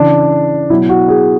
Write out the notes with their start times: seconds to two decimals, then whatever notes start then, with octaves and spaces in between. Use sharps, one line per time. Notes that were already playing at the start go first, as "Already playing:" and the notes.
Already playing: C#3 E3 D4
0.70 B2 F#3 E4
0.89 F#4
1.08 G#4